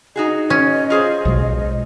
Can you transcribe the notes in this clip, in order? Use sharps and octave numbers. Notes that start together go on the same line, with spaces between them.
D#4 F#4 G#4 D#5
C#4
F4 G#4 C5
B1 B2 G#3